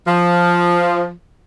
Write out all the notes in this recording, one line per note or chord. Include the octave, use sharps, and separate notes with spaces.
F3